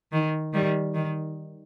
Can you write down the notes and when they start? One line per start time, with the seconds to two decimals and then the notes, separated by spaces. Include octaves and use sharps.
0.12 D#3
0.54 D#3 G3
0.95 D#3